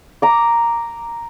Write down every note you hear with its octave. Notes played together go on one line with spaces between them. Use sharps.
A#5 D6